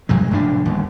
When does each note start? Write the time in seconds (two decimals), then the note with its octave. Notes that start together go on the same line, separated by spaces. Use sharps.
0.09 B1 G2 F#3 G#3
0.31 F1 A2 F3 D4
0.65 G1 D#2